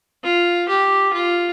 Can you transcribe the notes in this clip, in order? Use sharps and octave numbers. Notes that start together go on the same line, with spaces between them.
F4
G4
F4